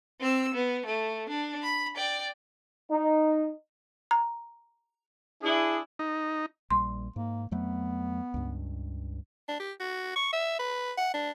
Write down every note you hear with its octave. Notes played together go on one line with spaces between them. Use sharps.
C4 E6
B3
A3
D4
B5
D5 G5
D#4
A#5
D4 E4 G#4
D#4
A#1 G3 C6
G#2 A#3
F2 F#3 A3 B3
C#2 G2
D4
G4
F#4
C#6
E5
B4
F#5
D4